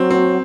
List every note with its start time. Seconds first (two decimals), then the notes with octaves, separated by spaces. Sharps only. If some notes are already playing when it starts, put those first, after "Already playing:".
Already playing: F#3 C4
0.10 C4